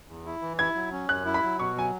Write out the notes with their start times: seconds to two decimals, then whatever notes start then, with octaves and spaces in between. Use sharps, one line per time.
0.08 E2
0.25 E4
0.42 E3
0.58 E4 G#6
0.75 F#3
0.92 C#4
1.09 F#2 F#6
1.25 E4
1.34 B5
1.43 F#3
1.59 B2 C#6
1.76 F#3 G#5